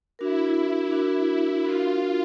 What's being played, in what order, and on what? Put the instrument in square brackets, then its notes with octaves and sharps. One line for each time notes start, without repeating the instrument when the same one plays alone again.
[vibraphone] D4 F#4 A#4 [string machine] E4
[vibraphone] D4 F#4 A#4
[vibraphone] D4 F#4 A#4 [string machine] F4